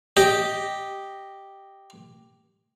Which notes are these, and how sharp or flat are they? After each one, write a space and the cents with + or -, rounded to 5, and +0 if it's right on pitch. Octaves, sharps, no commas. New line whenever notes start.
G4 +0 D#5 +0